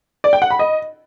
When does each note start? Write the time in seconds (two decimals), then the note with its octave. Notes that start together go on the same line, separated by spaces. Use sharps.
0.24 D5
0.33 G5
0.42 F#5
0.51 B5
0.59 D#5